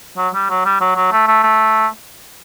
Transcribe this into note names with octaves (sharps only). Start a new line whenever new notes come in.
F#3
G3
F#3
G3
F#3
F#3
A3
A3
A3